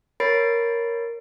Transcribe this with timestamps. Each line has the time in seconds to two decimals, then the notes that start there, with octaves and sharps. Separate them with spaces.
0.20 A#4 C#5 B5 A6 C7 D7